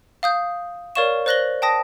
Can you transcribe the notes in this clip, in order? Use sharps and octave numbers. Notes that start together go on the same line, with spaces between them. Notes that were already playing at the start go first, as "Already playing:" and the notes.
F5 D#6 G6
A#4 C#5 D5 F5 C#6 E7
C5 D5 F#6 A#6 F#7 G7
G5 A5 D#6 A#6